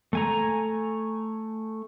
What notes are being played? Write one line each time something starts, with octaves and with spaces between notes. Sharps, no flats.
A3 G#5 A#5